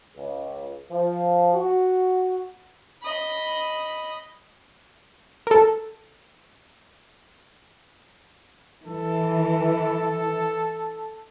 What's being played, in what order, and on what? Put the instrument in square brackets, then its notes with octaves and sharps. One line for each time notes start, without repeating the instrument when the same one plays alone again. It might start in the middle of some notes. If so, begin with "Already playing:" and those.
[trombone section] C#2
F3
F#4
[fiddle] D#5 B5
[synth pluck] A4 A#4
[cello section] E3 [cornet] A4